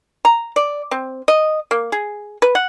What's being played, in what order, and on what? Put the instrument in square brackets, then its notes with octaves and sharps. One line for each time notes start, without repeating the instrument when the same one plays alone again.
[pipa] A#5
D5
C4
D#5
A#3
G#4
B4
F#5